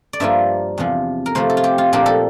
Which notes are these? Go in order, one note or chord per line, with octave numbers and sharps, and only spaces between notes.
D5
G2 F3 A#3 F4 E5
E2 C3 F3
A#4
C3 F3 A3 C5
A4
F4
G4
F4
A#2 F3 A#3 D4 G4
A4